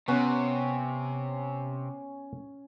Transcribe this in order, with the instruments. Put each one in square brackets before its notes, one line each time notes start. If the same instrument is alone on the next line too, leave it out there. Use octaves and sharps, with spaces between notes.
[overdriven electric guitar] C3 [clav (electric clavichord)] B3 F#5 [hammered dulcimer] C#4